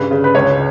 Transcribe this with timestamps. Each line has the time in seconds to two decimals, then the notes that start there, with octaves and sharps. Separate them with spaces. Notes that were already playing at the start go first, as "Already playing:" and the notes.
Already playing: G2 C#3 B4
0.11 C#3
0.24 B4
0.35 C#2 C#5